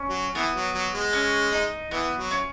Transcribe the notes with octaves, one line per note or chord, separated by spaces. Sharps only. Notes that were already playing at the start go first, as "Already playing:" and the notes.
Already playing: C#4
F#3
E3 B3
F#3
F#3
G#3
C#4
D#4
E3 B3
F#3
C#4